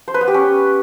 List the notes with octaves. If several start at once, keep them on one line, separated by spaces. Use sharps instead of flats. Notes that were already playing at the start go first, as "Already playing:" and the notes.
C5
B4
B3
G4
C#4